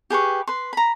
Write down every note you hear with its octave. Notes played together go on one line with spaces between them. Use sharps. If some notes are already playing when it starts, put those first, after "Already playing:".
G4 G#4 B4 C#6
B4 C6
A#5 B5